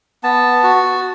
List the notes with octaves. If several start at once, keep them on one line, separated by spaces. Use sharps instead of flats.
B3 A5
F#4